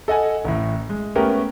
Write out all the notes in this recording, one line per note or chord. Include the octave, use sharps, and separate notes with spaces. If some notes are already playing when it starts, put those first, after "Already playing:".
A4 D#5 F#5 G#5
A1 A2
G#3
A3 B3 C#4 G4 A#4